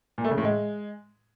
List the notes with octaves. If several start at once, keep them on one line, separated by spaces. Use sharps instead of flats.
A#2
A3
C#3
A2
G#3